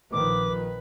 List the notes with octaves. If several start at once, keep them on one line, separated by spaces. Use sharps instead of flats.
A#1 D#3 F3 B4 D6